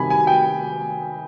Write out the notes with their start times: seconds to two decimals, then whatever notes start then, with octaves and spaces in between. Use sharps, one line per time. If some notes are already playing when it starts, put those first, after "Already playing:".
Already playing: C3 D#3 G3 G#5 B5
0.10 G#5
0.27 G5